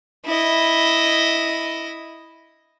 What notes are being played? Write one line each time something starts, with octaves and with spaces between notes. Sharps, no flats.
E4 D#5